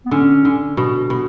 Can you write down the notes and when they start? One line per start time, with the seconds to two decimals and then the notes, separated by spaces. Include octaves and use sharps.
0.05 B3
0.11 D3 C#4
0.45 D3
0.77 B2
1.10 B2